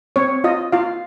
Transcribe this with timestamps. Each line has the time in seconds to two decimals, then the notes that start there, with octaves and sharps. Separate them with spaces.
0.16 C4 C#5
0.44 F4 D#5
0.72 F4 F5